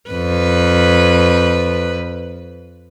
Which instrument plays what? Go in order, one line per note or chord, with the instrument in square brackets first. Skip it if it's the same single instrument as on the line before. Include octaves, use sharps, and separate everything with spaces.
[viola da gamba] F2 B4